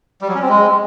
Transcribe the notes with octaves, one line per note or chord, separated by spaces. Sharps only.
G3
F#3
C#4
C4
G#3